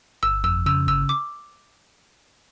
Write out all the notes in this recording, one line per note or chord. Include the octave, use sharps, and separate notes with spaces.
G1 E6
F2 E6
C#3 E6
G1 E6
D6